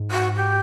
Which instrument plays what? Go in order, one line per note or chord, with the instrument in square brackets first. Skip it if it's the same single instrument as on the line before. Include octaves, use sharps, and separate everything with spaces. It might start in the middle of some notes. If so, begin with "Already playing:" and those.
Already playing: [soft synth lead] G#2
[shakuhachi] F#4
G4